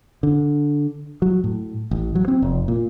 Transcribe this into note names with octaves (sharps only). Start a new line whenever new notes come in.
D3
F#3
A2
A1
F#3
C4
F1
A#2